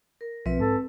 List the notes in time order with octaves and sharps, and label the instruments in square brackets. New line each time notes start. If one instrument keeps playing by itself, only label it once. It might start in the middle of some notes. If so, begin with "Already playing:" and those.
[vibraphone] A#4
[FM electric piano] B1 F3 E5 [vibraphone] C4 B4
[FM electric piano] G#2 [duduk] A4